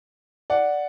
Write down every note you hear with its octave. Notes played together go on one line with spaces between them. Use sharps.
D5 F#5